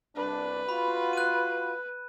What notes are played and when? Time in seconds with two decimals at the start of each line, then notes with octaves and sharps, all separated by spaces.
0.16 C2 D4 B4
0.69 F4 F#4 B5
1.13 F#6 D#7